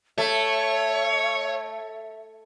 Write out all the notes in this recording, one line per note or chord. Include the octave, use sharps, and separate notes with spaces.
A3 C#5 E5